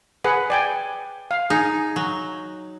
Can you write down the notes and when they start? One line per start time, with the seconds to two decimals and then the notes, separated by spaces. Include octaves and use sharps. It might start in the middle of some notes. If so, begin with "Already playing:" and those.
0.24 G#4 B4 F#5
0.50 D5 G5 G#5
1.31 F5
1.50 D#4 G#4
1.96 F#3